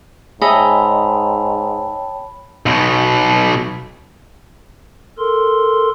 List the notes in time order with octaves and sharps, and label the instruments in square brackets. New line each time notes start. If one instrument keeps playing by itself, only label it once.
[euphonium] G#2 [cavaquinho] G#4 D#5 E5 [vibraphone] C#5 G5 A5 [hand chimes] B5
[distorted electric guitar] B1 B2
[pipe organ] A4 A#4 C6